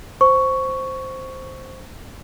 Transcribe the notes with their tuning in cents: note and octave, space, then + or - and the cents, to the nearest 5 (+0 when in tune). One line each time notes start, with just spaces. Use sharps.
C5 +0 C#6 +5